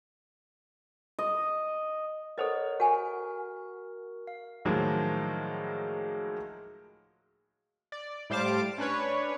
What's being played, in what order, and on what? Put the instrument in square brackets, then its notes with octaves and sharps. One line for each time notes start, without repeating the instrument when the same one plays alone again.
[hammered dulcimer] D#5
[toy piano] A4 C5 D#5 [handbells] A#4 C#5 F#5
[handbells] F#4 A#4 [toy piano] F#5 G#5
[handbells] F5
[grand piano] A2 D#3 F3 F#3 G#3 A#3
[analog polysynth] D5
A2 G3 C5 F5 A5 D6
C#4 D4 B4 C#5